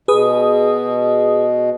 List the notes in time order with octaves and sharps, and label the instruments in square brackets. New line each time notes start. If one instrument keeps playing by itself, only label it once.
[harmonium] B2 [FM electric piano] G#4 B4 D#6